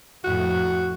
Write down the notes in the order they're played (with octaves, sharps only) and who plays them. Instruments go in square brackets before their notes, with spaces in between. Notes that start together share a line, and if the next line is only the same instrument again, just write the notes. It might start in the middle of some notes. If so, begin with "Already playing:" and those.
[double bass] F2 A2 [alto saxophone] F#4